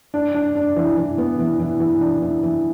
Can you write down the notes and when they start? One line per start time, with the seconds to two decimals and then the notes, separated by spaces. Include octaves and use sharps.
0.14 D4
0.35 D4
0.55 D4
0.76 E3
0.97 E3
1.18 B3
1.38 E3
1.59 E3
1.80 E3
2.01 D4
2.22 E3
2.43 E3